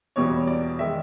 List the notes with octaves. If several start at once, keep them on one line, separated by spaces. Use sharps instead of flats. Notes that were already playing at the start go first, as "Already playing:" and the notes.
E2 B2 G3 C#5
D5
D#3 G#3 E5